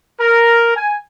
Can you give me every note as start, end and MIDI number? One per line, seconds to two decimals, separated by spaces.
0.20 0.74 70
0.75 0.97 80